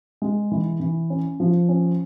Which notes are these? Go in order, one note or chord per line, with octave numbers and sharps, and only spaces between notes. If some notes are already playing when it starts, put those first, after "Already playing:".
G#3
E3
E3
C#4
F3
C#4